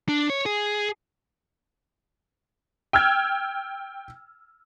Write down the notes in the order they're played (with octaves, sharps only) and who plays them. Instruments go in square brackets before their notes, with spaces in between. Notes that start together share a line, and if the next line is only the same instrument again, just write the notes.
[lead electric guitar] D4
C#5
G#4
[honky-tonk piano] G5 E6 F6 G#6